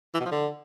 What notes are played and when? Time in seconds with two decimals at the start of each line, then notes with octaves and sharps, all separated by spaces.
0.14 E3
0.20 B2
0.26 F3
0.31 D3